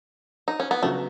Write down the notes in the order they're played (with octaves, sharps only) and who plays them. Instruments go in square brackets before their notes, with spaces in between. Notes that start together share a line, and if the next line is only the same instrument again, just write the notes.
[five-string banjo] D#4
C#4
B3
[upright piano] C#3 F#3 B3 F#4 [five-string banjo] A3